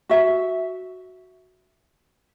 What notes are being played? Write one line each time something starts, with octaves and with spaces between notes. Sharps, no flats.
F#4 E5